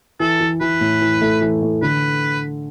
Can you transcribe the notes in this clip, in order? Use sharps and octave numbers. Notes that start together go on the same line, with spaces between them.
E3 A4
E3
E3 B4
A2
E3
A3
E3
A3
D3 B4